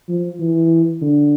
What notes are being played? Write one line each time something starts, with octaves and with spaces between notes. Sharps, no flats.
F3
E3
D3